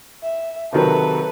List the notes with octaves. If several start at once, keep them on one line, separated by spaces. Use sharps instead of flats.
E5
C3 D#3 F#3 A4 B4